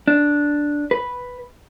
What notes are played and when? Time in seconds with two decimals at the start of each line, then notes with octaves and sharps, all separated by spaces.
0.08 D4
0.91 B4